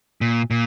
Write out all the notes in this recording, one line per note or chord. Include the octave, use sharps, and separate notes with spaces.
A#2
A#2